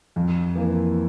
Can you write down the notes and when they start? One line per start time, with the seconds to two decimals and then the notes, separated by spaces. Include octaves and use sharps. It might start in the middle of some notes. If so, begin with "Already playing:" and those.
0.16 F2
0.55 E3 A#3